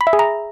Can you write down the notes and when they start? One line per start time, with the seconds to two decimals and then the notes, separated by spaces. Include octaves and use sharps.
0.01 B5
0.07 E5
0.13 G#4
0.19 A#5